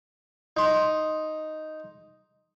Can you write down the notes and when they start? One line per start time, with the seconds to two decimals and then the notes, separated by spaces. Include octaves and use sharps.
0.57 D#4 C6